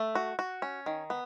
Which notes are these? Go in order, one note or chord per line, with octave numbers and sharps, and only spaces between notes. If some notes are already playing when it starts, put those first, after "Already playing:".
Already playing: A3
F#4
F#4
C#4
D#3
B3